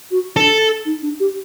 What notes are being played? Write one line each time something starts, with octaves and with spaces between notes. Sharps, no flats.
F#4
D4 A4
D#4
D4
G4